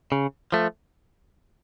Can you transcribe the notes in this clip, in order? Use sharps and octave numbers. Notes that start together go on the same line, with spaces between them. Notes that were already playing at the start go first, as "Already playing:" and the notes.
C#3
F3 A3